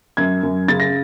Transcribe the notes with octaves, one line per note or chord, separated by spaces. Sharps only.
F#2 G#6
F#2
C#3 A6
A#6